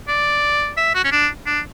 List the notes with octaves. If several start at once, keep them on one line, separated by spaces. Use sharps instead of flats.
D5
E5
F#4
C#4
D4
D4